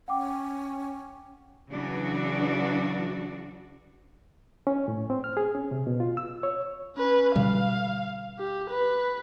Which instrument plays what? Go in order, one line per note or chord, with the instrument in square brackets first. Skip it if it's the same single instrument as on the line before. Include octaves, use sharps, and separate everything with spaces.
[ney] C#4 [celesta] F#5 G5 D6
[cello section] C#3 E3 F#3 D4 F#4
[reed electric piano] C#4
A2
C4
F6
G#4
C#4
C3
B2
F4
E6
C#5
[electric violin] C#4 B4
[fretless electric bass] B2 D3 G3 [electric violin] F5
[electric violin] G4
B4